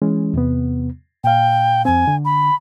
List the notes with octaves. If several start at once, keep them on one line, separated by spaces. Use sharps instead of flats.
E3 G#3 C#4
E2 C3 B3
A#2 F5 G5
F2 C4 G#5
D3
B5